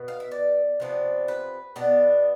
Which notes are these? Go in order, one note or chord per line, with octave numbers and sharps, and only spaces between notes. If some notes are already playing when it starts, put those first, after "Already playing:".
Already playing: B2 B3
F5
E5
D5
C3 F3 B3 D4
B4
B2 B3 D4